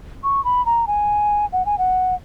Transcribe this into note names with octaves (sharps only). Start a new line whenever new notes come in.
C#6
B5
A#5
G#5
F#5
G#5
F#5